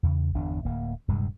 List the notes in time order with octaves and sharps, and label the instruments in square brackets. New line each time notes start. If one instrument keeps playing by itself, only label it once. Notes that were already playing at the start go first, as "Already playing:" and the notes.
[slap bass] E2 C#3
G1 E2 D4
D1 A#3
D#1 G2 C3 G#3